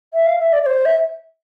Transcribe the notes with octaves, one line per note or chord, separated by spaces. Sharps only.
E5
F5
E5
D5
D5
C5
E5